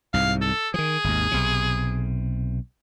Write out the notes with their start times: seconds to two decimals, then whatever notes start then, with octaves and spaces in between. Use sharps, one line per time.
0.14 C2 G#2 F5
0.41 A4
0.74 D#3 F3 G#4
1.04 G#1 D#2
1.31 B1 C3